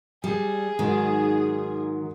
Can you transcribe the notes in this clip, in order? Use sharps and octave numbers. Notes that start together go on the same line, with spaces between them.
G3 G#4
G#2 D#3 F#3 D#4